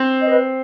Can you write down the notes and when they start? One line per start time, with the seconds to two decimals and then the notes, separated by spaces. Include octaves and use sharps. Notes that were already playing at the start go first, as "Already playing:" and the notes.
Already playing: C4
0.22 B4 D#5